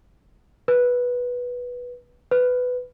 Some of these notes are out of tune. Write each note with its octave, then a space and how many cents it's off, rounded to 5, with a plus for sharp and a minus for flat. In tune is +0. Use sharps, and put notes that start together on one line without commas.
B4 -10
B4 +15